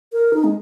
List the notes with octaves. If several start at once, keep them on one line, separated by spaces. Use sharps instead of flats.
A#4
D#4
G#3